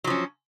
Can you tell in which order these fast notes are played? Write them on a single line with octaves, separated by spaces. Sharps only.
F#3 F3 C#4